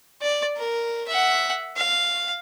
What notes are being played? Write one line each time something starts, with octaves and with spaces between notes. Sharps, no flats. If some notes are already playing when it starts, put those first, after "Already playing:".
D5
A#4
E5 F#5
F5